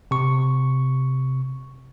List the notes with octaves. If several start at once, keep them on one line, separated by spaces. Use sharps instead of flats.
C3 C#6